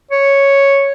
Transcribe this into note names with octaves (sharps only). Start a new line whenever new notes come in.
C#5